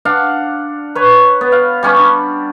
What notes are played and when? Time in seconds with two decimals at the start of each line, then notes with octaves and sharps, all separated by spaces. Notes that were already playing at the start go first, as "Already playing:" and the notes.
0.05 D4 F5 F#5
0.95 B4 C#5
1.41 B3
1.52 F5
1.83 G3 C#4 B5 C#6
1.97 D4